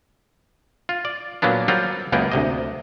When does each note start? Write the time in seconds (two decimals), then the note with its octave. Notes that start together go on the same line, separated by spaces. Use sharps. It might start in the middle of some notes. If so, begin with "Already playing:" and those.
0.89 F4
1.05 D5
1.42 A#2 F#3 A#3 B3 D4
1.68 F#3 G3 F4 A#4 C5 F#5
2.12 C#2 F#2 A#3 B3 G#4 G5
2.32 D2 C3 D#5